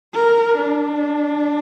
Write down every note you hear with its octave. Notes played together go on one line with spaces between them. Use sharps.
A#4
D4